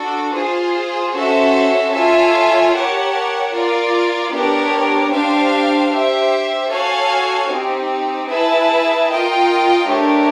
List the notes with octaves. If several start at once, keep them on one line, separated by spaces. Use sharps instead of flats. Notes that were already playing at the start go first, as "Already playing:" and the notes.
Already playing: D4 F#4 A4
F4 G#4 C5
C#4 F#4 A4 C5 E5
F4 A4 C#5 E5 G#5
G4 A#4 C#5 F#5 A5
F4 A#4 D5
B3 D4 G4 A#4 C#5
D4 G4 C5 F5
G4 C5 E5
F#4 A4 C#5 F5 G#5
C4 D#4 G4
E4 G#4 B4 E5 A5
F4 A#4 D#5 G5
A3 D4 G4 A#4 C#5